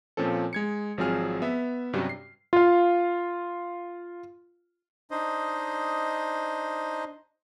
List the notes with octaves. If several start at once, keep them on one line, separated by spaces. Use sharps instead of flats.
A#2 F3 C4 C#4 A4
G#3 G#6 C#7
G#1 F3 F#3 C4 G#4 F6
B3 E5
G2 C3 F#3 G3 C#4
C7
F4 F5
D4 D#4 C5 D#5